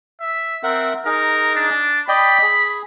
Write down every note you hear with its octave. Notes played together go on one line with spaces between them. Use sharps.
E5
C4 A#4 E5 F#5
D#4 G#4 A#4
D4
D5 D#5 G5 B5
G#4